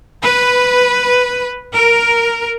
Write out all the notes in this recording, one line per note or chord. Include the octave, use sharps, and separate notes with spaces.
B4
A#4